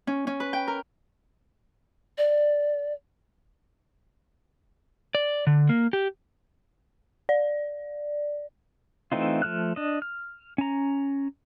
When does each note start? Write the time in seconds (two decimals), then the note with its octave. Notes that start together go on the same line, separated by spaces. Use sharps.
0.07 C#4
0.27 C#4
0.40 B4
0.53 G5
0.67 A#4
2.18 D5
5.15 D5
5.47 D3
5.69 A#3
5.93 G4
7.29 D5
9.12 E3 A3 C4 D#4 F4
9.42 F3 A3 F6 F#6
9.76 D4 D#5
10.02 F6
10.58 C#4 A#5